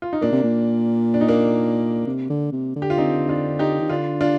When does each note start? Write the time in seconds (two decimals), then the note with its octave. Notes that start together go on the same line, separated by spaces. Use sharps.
0.02 F4
0.13 D#4
0.21 A#2 A#3 D4
0.32 C3
0.43 A#2
1.14 D4
1.21 D#4
1.28 A#3 D4
2.06 C3
2.30 D3
2.52 C3
2.76 D3
2.82 G4
2.90 F4
2.98 C4 D#4
3.29 D4 F4
3.59 D#4 G4
3.81 D#3
3.89 D3 D4 F4
4.21 D4 F4